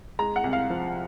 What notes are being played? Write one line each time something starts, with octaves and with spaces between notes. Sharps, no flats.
G#3 A#5
F#5
C2
F5
F3